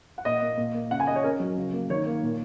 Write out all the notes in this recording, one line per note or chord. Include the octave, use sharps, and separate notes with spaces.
F#5
A#2 D#5
A#3
A#2
A#3
C#3 F#5
G#5
A#3 D#5
C#5
C#4 A#4
F#3
C#3
A#3
D#3 C#5
A#3
A#2